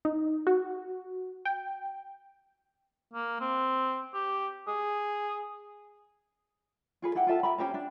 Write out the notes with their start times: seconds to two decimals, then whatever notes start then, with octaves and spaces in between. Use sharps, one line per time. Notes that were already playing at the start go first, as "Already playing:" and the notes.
0.05 D#4
0.47 F#4
1.45 G5
3.13 A#3
3.41 C4
4.14 G4
4.68 G#4
7.02 F4 G#4 B4
7.15 E4 G4 F#5 G5
7.27 F4 A4 E5 A5
7.43 G4 E5 A#5 B5
7.58 C#4 G4 C5 A#5
7.74 D4